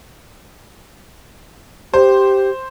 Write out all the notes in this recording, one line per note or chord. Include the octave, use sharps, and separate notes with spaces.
G4 C5